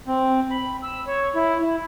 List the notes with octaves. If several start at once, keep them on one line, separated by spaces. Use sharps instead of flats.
C4
B5
E6
C#5
E4
E4